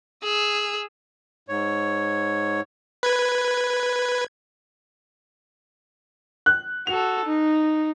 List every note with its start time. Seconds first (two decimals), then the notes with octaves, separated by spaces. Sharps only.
0.23 G#4 E6
1.49 G#2 C#5
3.03 B4 G#6
6.46 F#6
6.87 F#4 A4 F7
7.25 D#4